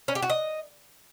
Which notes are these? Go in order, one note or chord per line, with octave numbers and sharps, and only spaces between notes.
C#4
G4
F#4
D#5